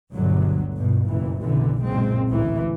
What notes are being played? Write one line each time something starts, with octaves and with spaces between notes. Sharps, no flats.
G1 D2 B2 D3 F#3
G1 G2 B2
F#1 B1 A#2 E3
F#1 B1 F#2 D3 E3
F#1 A#2 G#3 C4
A1 D2 E3